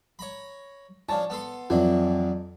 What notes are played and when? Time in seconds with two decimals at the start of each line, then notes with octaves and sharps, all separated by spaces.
0.19 C#5 A#5 B5
1.09 F3 D4 C#5 A5
1.30 B3 A4 C6
1.70 F2 E3 F#3 D4